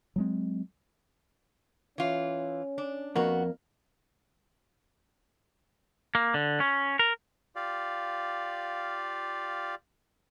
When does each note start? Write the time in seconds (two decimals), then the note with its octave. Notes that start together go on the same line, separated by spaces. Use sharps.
0.16 F#3 G#3 C4
1.98 E3 C#4 F4
2.78 D4
3.16 F2 A#3 B3 F#4
6.15 A#3
6.34 D3
6.60 C#4
6.99 A#4
7.56 F4 G4 D5 F5